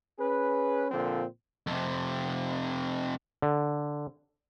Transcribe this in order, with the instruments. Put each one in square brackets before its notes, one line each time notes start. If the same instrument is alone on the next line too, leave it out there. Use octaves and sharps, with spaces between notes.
[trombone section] C#4 G#4 B4
A#2 D3 F3 C4
[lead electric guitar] F2 C3
[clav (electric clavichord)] D3